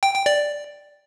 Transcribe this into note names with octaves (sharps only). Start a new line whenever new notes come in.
G5
G5
D5